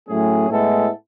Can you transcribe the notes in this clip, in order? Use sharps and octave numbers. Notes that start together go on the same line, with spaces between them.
A2 F#3 A3 C#4 G#4
A2 G#3 B3 E4 A4